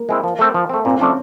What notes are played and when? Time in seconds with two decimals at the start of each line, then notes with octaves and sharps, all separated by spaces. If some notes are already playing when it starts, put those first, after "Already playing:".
Already playing: A#3
0.09 G#3 C4 E4
0.24 F3
0.39 A3 C4
0.54 F3
0.69 A3 C4
0.85 A#2 C4
0.99 F3 A3 C#4 D4 F4